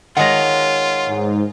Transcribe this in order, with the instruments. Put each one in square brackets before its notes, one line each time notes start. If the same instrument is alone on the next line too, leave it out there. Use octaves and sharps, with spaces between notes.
[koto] D#3 G#3 A#5 [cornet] F4 [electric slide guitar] C#5 F#5
[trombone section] G#2